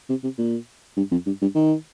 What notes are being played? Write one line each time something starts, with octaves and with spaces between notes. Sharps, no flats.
C3
C3
A#2
G2
F2
G2
G2
D#3